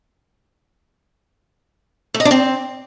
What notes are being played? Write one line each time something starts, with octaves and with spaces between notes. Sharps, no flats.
A3
D#5
D4
C4